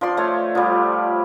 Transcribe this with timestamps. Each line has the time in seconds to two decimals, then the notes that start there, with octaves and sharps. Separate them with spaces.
0.01 F3 D5 C6
0.17 A3 C#5
0.55 F3 G3